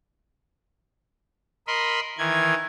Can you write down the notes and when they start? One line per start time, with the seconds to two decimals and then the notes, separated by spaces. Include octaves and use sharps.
1.67 A#4 D#5 B5 C6
2.18 D#3 E3 G#6